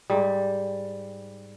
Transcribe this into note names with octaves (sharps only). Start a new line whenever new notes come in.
G#2 G3